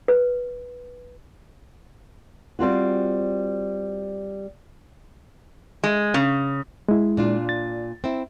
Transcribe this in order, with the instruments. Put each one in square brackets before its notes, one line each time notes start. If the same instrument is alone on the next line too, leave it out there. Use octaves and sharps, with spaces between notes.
[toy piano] B4
[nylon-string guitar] G3 C4 F4 F#4
[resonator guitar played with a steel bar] G#3
C#3
[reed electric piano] G#3 E4
[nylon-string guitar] A#2 D4 F4
[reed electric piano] A6
[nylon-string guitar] C4 E4